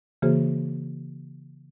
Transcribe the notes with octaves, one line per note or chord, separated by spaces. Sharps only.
C#3 E3 A#3 F#4 G#4 C5